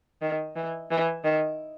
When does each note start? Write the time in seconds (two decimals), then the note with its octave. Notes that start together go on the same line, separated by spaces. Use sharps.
0.22 D#3
0.56 E3
0.91 E3
1.24 D#3